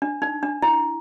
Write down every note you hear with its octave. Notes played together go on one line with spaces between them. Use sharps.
D4
D#4
D4
E4